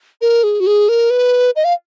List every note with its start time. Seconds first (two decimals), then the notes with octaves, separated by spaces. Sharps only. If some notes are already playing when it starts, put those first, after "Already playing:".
0.21 A#4
0.43 G#4
0.60 F#4
0.67 G#4
0.89 A#4
1.10 B4
1.56 D#5
1.64 F5